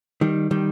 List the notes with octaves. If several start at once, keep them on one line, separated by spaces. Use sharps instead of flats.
D#3 G3
D#3 G3